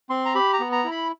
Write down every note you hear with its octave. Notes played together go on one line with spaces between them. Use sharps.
C4 C6
A#5
G4 B5
A#5
B3
A#5
E4
B5